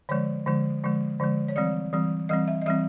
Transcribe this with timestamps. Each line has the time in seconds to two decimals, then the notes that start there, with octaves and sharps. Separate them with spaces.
0.09 D3 F3 G#3 C#5
0.46 D3 F3 G#3
0.83 D3 F3 G#3
1.20 D3 F3 G#3
1.48 C#5
1.56 E3 G3 C4 D5
1.93 E3 G3 C4
2.29 E3 G3 C4 D#5
2.48 E5
2.62 D#5
2.66 E3 G3 C4 E5